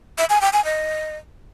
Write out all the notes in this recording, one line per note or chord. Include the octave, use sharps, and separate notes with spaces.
E5
G#5
G5
G#5
D#5